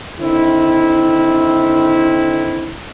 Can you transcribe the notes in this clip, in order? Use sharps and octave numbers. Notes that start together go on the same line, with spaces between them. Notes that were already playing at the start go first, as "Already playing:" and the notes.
D3 D#3 C4 E4